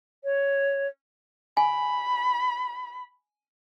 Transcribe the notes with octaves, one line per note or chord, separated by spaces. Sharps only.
C#5
G#5 B5